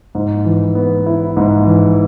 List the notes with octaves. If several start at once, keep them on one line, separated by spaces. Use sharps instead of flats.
G#2
E3
B3
E4
G#2
E3